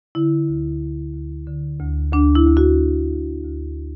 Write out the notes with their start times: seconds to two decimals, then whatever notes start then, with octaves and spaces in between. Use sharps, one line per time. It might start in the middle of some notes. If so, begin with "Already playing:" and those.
0.15 D3 E4
0.48 D2
0.82 D2
1.14 D2
1.47 D3
1.80 D2
2.13 D2 D4
2.35 E4
2.46 D2
2.57 F#4
2.79 D2
3.12 D2
3.45 D2